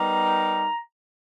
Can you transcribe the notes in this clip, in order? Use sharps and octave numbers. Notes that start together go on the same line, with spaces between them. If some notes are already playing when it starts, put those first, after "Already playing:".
Already playing: G3 B3 D#4 G4 A#4 A#5